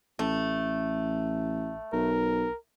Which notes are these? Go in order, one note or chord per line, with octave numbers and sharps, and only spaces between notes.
A1 A3
B1 A#4